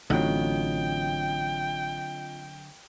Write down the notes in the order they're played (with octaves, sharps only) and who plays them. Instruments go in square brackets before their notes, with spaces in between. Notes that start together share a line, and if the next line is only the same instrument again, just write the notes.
[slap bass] A1 [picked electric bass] D3 F#3 [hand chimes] C4 F4 D#5 [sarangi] G5